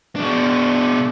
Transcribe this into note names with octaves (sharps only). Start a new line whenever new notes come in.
B2 D4